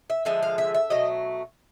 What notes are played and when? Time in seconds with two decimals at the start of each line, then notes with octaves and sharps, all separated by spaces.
0.10 E5
0.25 D3 F3 G#3 E5
0.43 F5
0.58 E5
0.75 E5
0.90 B2 F#3 A3 D#5